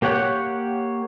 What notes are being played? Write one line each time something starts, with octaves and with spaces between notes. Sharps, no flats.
A#3 G4 C#5 F#5 G5